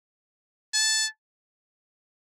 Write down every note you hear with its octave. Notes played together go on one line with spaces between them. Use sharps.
A5